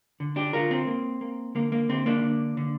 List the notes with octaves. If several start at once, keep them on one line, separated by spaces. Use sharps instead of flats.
D3
D4 G4
D3 F4 A#4
C4
A#3
A#3
D3 A#3
A#3
D3 C4
A#3 D4
D3
D3